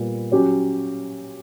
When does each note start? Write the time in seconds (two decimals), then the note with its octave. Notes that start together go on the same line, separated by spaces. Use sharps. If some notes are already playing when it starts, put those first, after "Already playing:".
Already playing: A#2 G3 B3
0.32 F#3 C#4 G4 C#5